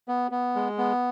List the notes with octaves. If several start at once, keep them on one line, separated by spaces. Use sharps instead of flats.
B3
B3
G#3
B3